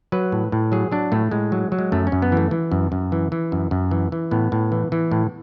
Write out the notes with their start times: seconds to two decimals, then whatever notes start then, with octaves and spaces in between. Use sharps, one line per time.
0.12 F#3 B4
0.32 A2
0.52 A2
0.72 F#3 G#4
0.92 F#3 D4
1.12 A2 A3
1.31 A2 G#3
1.52 F#3
1.72 F#3
1.79 G#3
1.92 F#2 A3
2.07 C#4
2.12 F#2
2.22 B3
2.32 E3 A3
2.51 E3
2.72 F#2
2.92 F#2
3.12 E3
3.32 E3
3.52 F#2
3.71 F#2
3.91 E3
4.12 E3
4.31 A2 B3
4.52 A2
4.72 E3
4.92 E3
5.11 A2